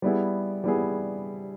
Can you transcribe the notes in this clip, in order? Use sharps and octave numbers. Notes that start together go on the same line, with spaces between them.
G3 B3 E4 G#4
G3 B3 E4 G#4